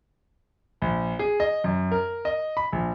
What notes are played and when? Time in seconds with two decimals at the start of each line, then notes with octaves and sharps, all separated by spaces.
0.82 A#1
1.19 G#4
1.40 D#5
1.64 F#2
1.92 A#4
2.25 D#5
2.57 B5
2.72 A#1